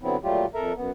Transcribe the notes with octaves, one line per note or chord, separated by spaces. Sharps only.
D3 F#3 B3 C4 E4
A#2 F#3 G3 A3 F4 G4
F2 A4 A#4 E5 A#5
F#2 B3